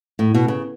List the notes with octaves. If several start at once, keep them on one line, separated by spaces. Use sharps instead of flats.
A2
B2
C#3